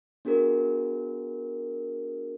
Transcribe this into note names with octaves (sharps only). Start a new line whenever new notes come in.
B3 D4 F#4 G#4 A#4